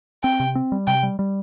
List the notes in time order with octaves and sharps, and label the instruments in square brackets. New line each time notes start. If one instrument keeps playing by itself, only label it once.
[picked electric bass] C4 [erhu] G5
[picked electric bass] C3
C4
G3
[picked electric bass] C3 [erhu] G5
[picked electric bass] G3
G3